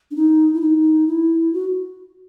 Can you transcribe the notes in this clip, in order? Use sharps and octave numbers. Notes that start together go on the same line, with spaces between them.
D4
D#4
E4
D#4
E4
F#4